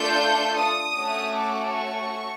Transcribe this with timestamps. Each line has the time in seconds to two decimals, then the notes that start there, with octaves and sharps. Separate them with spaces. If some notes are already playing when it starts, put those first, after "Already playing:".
Already playing: A3 D4 F4 A4 G6
0.56 D#6
0.96 A3 C#4 F#4 A4
1.35 D6
1.74 C#6